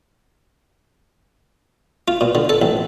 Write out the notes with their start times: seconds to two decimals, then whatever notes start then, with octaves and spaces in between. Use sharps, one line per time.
2.08 F4
2.21 A#2
2.35 D3
2.49 A4
2.62 A1